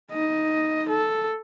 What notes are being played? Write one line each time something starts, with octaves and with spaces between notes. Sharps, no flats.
D#4 D#5
A4